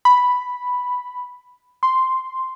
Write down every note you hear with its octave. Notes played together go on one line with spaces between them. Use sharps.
B5
C6